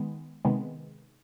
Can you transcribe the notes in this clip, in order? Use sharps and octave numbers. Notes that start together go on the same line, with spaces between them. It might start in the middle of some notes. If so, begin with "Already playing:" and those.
Already playing: D#3 G#3 B3
C3 D#3 G#3 B3